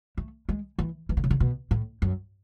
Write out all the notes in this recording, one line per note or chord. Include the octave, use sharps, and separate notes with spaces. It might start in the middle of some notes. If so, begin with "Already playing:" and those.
A3
G#3
E3
E3
D3
C#3
D3
B2
A2
F#2